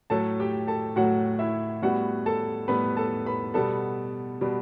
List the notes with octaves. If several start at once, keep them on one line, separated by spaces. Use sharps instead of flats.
A2 F#3 A3 A4 A5
G4 G5
A4 A5
A2 F#3 A3 F#4 F#5
E4 E5
A2 G3 B3 F#4 F#5
A4 A5
A2 G3 B3 B4 B5
A4 A5
B4 B5
B2 G3 B3 A4 A5
B2 G3 B3